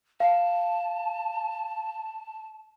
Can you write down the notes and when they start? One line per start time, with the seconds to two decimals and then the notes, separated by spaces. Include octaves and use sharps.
0.20 F5 A5